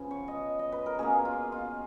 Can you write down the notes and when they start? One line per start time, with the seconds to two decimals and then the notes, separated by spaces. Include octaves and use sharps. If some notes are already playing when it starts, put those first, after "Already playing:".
Already playing: C#3 F3 B3
0.11 C#5
0.28 D#5
0.59 D#5
0.72 B4
0.86 A#4
0.99 B2 A#3 C#4 G#4
1.25 F4
1.52 F4